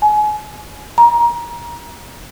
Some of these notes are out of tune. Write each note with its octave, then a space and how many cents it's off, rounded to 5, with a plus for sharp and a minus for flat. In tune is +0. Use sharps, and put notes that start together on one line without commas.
G#5 +25
A#5 +25